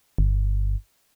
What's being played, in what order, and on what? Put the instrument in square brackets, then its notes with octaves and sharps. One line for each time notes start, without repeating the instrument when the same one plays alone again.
[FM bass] G1